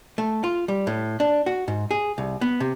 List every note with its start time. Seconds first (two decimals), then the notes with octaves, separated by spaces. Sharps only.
0.18 A3
0.44 F4
0.68 G3
0.87 A2
1.20 D4
1.46 F#4
1.68 G#2
1.91 G#4
2.18 C2
2.41 B3
2.60 C3